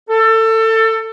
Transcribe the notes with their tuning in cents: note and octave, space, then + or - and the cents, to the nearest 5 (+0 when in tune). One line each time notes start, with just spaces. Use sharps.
A4 +25